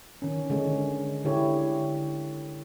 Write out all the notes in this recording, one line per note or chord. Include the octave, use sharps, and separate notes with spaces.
D#3 C#4
D3 G#3 C#4
D3 E4 G4 C#5